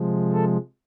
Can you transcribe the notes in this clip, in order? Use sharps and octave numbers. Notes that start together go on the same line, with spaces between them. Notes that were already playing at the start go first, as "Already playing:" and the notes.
Already playing: C3 F3 G#3
A4